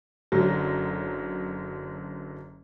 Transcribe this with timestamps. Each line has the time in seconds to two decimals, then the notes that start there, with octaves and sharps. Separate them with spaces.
0.32 F#1 F#2 D3 F#3